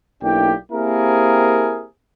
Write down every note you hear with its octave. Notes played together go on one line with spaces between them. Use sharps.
B1 A#3 D4 E4 G4 G5
A#3 C4 E4 G4 G#4 A#4